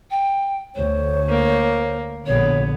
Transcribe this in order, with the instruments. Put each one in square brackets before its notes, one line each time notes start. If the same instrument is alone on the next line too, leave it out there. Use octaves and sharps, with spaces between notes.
[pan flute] G5
[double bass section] D2 [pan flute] C5 [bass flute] C#5
[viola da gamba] A#3
[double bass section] A#1 B2 D3 [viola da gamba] B3 [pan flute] C#5